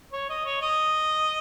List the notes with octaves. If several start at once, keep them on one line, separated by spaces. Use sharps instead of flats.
C#5
D#5
C#5
D#5